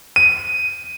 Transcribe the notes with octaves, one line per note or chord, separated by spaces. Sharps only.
D#7